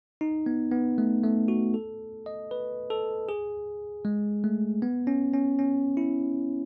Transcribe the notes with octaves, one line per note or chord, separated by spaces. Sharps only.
D#4
B3
B3
A3
A3
F#4
A4
D#5
B4
A4
G#4
G#3
A3
B3
C#4
C#4
C#4
E4